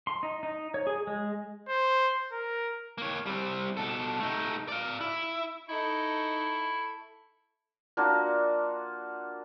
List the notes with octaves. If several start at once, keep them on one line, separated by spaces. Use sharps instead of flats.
C6
D#4
D#4
C#5
G#4
G#3
C5
A#4
A#3 C#5
G3 C4
B2 A4
A3 D#4
D5 F5
E4
D#4 E4 A4 C#6
A#3 D4 F4 F#4